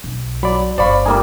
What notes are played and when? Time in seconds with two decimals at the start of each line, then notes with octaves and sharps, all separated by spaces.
0.04 B1
0.43 F#3 D5 B5
0.78 G1 C5 D5 F5 B5 C#6
1.06 G3 A#3 D#4 G#5